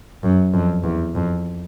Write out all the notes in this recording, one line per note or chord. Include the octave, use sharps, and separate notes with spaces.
F#2
F2
E2
F2